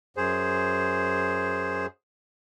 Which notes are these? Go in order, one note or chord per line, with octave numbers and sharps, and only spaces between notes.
F#2 G#4 C5